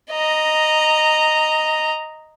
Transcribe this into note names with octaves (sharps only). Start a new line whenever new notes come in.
D#5 A#5